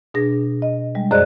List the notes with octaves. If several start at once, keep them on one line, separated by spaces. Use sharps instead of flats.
B2 D4 G#4 A#6
D#5
G3 G#3
F#2 G#4 C5 D5 D#5 F#6